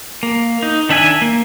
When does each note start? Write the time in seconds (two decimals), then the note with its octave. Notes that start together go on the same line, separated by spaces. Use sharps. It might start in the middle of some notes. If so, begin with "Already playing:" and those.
0.23 A#3
0.63 D#4
0.89 D#3 D4 E5 G#5
1.22 A#3